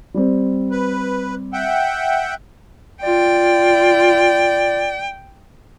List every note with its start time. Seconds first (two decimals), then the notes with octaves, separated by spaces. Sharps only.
0.14 G3 C4
0.71 B4
1.53 E5 F#5 G5
3.03 F4 D5 G5